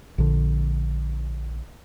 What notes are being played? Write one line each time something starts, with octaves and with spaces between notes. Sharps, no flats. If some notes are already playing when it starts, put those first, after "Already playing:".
A#1 D3